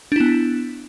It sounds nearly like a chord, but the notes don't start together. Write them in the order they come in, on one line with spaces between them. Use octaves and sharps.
D4 E4 B3